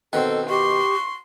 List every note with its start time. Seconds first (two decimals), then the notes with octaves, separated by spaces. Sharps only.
0.13 B2 D#3 C4 A4 F#5
0.50 G4 C6 C#6